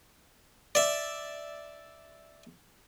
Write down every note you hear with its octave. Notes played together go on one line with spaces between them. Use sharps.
D5 E5